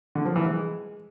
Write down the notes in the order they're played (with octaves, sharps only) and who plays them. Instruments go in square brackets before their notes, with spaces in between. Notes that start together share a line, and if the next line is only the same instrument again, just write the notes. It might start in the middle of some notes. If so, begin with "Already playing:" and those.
[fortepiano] D3
F3
E3
G#3